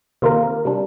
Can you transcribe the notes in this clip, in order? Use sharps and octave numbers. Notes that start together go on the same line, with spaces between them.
C3 D#3 A#3 F4 A#4
C3 G3 D4